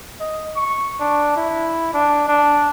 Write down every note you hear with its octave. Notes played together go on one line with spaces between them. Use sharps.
D#5
C#6
D4
E4
D4
D4